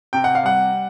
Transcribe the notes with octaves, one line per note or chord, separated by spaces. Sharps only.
C3 G5
F#5
F5
G3 F#5